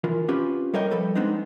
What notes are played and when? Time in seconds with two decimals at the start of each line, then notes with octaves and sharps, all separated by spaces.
0.04 E3 F4 A#4
0.28 C4 C#4 F4 G4 B4
0.74 G3 A4 A#4 C#5 D#5 G5
0.91 F3 G3 A4 B4
1.15 G#3 B3 C4 D4 D#4